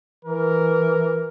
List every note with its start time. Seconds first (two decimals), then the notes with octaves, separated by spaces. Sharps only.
0.25 E3 A#4